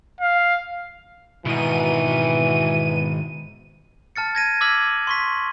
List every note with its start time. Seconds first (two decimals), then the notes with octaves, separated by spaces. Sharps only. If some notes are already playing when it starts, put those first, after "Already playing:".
0.20 F5
1.45 G#2 B2 D#3 E3 D#7
4.16 A5 F6 A6 C#7
4.35 G#6 A#6 D#7
4.61 D6 E6 F6 G#6 B6 F#7
5.07 C6 C#6 B6